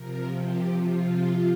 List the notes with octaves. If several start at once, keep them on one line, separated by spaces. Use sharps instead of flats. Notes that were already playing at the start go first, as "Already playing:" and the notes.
Already playing: C3 F3 A#4
G4
F4